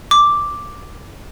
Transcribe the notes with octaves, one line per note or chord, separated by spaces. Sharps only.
D6